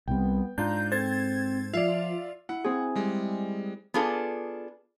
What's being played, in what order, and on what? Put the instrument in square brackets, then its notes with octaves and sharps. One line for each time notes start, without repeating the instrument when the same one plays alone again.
[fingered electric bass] C2 C3 G3 [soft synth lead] B3 [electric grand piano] G5
[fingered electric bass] G#2 [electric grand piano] D4 F4 [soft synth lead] A#5 [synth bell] G6
[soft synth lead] C4 [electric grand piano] A4 C5 [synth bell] G#6 A6
[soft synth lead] F3 [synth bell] F4 [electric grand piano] D5 E5
[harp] E4 [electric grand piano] F#5
[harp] C4 G#4
[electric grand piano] G3 G#3
[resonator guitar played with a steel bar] B3 D4 F4 G#4 A4